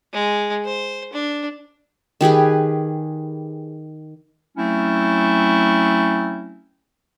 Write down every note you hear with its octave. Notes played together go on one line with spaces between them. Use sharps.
G#3
C5
D4
D#3 G4 G#4 B4
F#3 A3 C4 C#4 E4